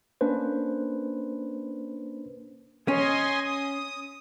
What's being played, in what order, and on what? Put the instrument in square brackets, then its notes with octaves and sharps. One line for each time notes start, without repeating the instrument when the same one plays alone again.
[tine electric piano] A#3 C#4 D4 B4 C5
[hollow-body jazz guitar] C#4 [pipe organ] D#5 G#5 C6
[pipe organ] D#6